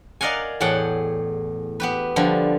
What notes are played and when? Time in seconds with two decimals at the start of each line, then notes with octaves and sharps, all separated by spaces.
0.21 A#4 D5 D#5 F5 F#5 G#5
0.61 E2 A2 G#4 F#5 G5 A5
1.80 B3 G4 B4
2.16 D3 F3 G3